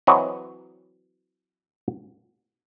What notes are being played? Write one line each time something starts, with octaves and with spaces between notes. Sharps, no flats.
E3 F#3 C4 F#4 C#5 D#5